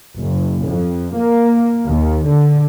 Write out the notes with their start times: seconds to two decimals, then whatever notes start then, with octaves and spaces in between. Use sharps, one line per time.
0.17 F#1
0.67 F2
1.15 A#3
1.89 D#2
2.27 D3